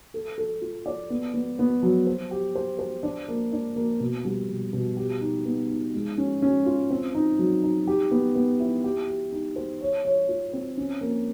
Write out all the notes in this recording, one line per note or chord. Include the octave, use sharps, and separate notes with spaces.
A4
A4
F4
D5
B3
B3
B3
F#3
C5
G4
C5
C5
D4
A#3
D4
A#3
B2
G3
B2
B2
G4
D#4
B3
D#4
G#3
C#4
C#4
F4
C4
D#4
F#3
D#4
G4
B3
B3
E4
G4
G4
D#4
C5
C#5
C#5
F4
C4
C#4
A#3